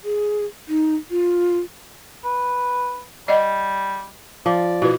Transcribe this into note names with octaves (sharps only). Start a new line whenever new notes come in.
G#4
D#4
F4
B4
G3 D5 D#5 F#5
F3 D5
B2 E4 B4